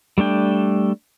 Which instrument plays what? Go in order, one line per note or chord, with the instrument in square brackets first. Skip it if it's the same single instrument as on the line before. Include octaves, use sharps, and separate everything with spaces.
[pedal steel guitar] G3 A3 D4 G5